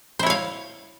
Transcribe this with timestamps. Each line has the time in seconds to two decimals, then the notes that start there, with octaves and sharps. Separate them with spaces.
0.19 C5
0.23 E4
0.26 C#5
0.30 F5